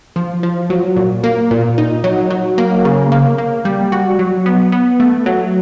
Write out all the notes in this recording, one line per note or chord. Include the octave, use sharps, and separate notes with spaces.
F3
F3
F#3
A#2
A#3
A#2
D#4
F#3
F#3
A#3
C#3
A#3
A#3
G3
F#4
F#3
B3
B3
A3
F#3